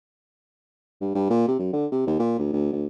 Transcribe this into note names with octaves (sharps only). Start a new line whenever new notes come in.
G2
G2
A#2
C3
F#2
D3
C3
D#2
A#2
D2
D2
D2